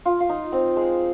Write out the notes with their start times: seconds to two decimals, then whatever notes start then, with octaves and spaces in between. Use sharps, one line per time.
0.06 F4
0.20 F4
0.29 D#4
0.52 C4
0.77 G#3